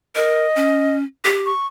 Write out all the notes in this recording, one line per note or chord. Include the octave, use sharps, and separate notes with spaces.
A#4 D#5
C#4
G4
C#6